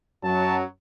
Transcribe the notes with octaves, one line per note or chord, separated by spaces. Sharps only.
F#2 F#3 A5